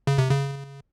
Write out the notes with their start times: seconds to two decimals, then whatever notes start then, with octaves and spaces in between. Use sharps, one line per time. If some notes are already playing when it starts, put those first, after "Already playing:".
0.07 C#3
0.18 C3
0.30 C#3